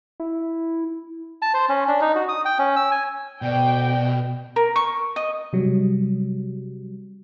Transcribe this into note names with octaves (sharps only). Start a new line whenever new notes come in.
E4
A5
C5
C#4
D4
D#4
F#4
D#6
G5
C#4
E6
G#5
D2 B2 D5 G5
A#4
C#6
D#5
C3 F#3 G3